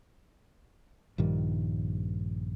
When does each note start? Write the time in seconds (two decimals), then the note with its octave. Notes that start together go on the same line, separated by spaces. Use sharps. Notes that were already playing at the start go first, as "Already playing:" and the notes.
1.18 A#1 G2 D#3 G3